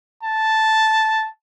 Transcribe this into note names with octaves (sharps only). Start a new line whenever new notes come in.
A5